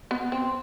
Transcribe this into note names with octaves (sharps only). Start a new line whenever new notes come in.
B3
C4